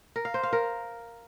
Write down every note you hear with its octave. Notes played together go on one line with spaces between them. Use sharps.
A#4
F5
C5
F5
A#4